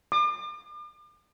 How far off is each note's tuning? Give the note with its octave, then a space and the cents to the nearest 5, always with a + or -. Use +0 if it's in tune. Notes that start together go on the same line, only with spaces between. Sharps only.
D6 +45